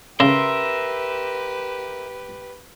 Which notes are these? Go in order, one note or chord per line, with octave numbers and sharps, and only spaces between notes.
C#3 G4 A#4 B4 E5 C6